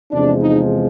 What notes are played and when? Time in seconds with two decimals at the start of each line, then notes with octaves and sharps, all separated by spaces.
0.12 E2 C3 F3 G#3 D4
0.41 D#4